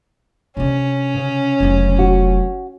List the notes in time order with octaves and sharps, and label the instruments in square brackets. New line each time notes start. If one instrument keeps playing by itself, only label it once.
[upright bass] C3 D4 [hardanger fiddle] C#4
[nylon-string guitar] C#3
[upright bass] F1 F#3
[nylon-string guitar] F#4